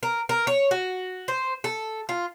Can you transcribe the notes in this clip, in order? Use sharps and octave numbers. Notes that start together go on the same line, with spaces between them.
A#4
A#4
C#5
F#4
C5
A4
F4